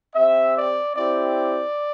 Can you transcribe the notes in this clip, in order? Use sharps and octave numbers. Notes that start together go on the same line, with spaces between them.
C4 G4 E5
D5
C4 E4 G4 D5